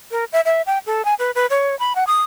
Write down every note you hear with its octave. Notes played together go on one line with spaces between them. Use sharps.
A#4
E5
E5
G5
A4
G#5
B4
B4
C#5
B5
F#5
D#6